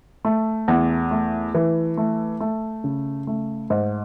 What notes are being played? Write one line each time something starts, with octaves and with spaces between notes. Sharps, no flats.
A3
E2
A3
E3
A3
A3
C#3
A3
G#2